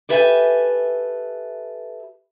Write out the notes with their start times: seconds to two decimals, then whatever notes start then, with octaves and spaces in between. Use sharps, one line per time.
0.09 G4 A4 B4 E5 G5 G#5